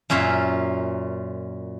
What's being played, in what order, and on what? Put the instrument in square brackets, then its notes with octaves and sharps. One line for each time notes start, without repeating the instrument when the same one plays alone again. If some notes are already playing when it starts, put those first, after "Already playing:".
[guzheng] F#2 A#2 C#4 F4 E5